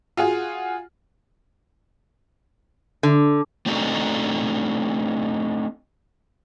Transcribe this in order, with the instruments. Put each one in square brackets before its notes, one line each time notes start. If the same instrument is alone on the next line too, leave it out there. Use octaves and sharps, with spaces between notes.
[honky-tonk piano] F4 F#4 G#4
[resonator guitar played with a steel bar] D3
[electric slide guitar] A3 C4 D4 D#4 F#4 A4